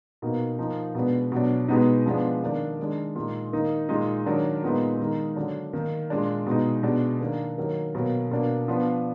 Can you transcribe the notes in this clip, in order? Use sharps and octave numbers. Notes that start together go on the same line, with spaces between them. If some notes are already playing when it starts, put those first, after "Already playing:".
B2 A#3 D#4
F3 A#3 D#4
B2 G#3 B3 D4
B2 F#3 D4
B2 G#3 B3 D#4
F3 G#3 B3 D4
D#3 A#3 D4
D#3 G#3 D4
A#2 G#3 D#4
D#3 A#3 D#4
A#2 G#3 D#4
D#3 F#3 D4
A#2 G#3 B3 D#4
D#3 G#3 D#4
D3 F#3 D4
D#3 A#3 D#4
A#2 G#3 D4
B2 G#3 D#4
B2 G#3 D4
D#3 A#3 D4
D#3 F#3 A#3
B2 F#3 A#3
B2 A#3 D4
F3 B3 D4